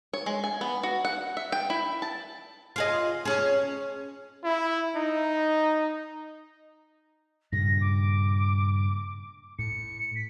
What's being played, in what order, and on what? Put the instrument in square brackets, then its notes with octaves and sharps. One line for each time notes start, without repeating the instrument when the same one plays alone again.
[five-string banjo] C#5
G#3
G#5
B3
F#4
F#5
E5
G5
E4
A5
[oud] F4 G#4 D#5
C#4 G#4
[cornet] E4
D#4
[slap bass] G2 A#2 C#3 [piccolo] A#6
[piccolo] D6
[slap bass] A2 [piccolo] C#7
[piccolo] B6